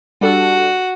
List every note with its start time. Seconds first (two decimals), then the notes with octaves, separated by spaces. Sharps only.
0.21 G3 D4 F#4 A4